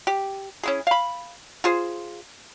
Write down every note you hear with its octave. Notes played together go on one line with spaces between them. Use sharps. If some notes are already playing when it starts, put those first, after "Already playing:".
G4
C#4 E4 G#4
F5 B5
F4 G#4 C5